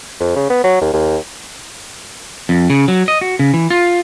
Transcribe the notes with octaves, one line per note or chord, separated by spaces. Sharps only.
F2
C#3
B3
F#3
D#2
D#2
F2
C#3
F#3
D#5
F#4
C#3
E3
F4